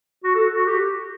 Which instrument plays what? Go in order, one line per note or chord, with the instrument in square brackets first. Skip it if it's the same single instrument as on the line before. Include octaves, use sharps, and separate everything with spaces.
[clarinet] F#4
A4
F#4
G4